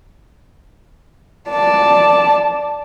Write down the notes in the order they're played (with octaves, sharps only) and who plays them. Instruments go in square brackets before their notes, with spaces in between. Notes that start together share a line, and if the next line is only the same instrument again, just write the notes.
[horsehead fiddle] D5 A5